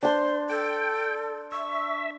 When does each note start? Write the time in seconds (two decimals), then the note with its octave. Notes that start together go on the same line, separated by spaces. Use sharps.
0.03 D4 C5 C6
0.50 A4 G5
1.52 E5 C#6